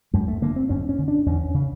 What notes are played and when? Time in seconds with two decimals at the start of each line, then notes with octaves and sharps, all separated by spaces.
0.13 F#2 G#3
0.28 A3
0.42 D3 A#3
0.56 C4
0.69 F#2 C#4
0.89 C#4
0.98 D3
1.08 D4
1.26 E2 C#4
1.54 C#3